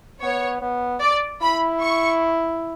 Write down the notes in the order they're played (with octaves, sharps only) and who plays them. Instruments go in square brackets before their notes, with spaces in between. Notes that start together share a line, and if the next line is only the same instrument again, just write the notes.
[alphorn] B3 [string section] C#5
[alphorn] B3
[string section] D5
[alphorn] E4 [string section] B5
[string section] C#6